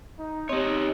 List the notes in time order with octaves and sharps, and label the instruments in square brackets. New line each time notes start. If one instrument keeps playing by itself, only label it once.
[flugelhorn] D#4
[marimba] C4 G4 [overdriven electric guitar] D#4 C#5 [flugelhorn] D#5